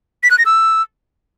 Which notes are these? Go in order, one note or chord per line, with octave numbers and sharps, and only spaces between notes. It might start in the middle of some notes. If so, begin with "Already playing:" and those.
B6
F#6
A#6
E6